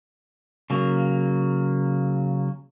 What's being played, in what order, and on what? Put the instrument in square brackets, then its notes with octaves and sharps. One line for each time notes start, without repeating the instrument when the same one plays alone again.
[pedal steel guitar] C#3 F#3 A#3